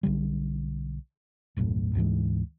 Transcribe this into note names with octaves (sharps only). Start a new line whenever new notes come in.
B1 D3 G3
D#1 B1 F#2 A2
D2 G#2 E3 G#3